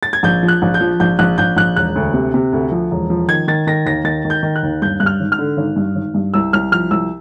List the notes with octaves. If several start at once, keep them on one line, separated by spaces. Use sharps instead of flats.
A6
G#6
A#1 G6
F3
F#6
A#1
G6
F3
A#1 G6
A#1 F#6
A#1 G6
A#1 F#6
E1 F#6
D2
C3
C3
D2
F3
E1
F3
D#3 G#6
D#3 A6
D#3 A#6
D#2 A#6
D#3 A6
D#3
G6
D#3
F#6
D#2
G2 G6
G2 F#6
F6
G#1
F6
D3
G#1
G2
G#1
G2
C2 E6
C2 F6
F3 F6
C2 E6